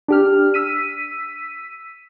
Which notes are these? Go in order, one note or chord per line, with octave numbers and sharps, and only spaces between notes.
D4 G4 F6
E6 B6 D#7